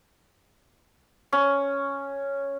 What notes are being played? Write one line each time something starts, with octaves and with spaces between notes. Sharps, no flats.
C#4